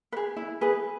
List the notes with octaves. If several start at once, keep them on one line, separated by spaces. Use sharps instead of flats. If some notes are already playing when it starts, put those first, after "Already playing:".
B4
G#4
E4
G#4 B4